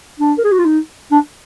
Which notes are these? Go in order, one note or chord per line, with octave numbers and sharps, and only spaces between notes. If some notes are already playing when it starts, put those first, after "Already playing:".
D4
A#4
G#4
F#4
F4
D#4
D4